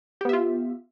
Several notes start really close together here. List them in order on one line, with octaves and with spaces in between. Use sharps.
G4 B3 E5 F4